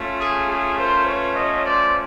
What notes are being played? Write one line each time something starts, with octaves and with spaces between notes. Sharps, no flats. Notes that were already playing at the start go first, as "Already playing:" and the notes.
Already playing: A3 C#4 F4
G#4
G#4
A#4 C5
B4 C#5
C#5 D#5
C5 D5